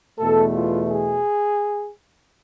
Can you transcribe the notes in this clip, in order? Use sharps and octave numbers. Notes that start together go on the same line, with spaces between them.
E2 B2 A3 A4
F4
G#4